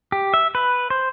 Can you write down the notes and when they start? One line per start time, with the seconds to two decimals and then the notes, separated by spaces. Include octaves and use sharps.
0.12 G4
0.34 E5
0.55 B4
0.90 C5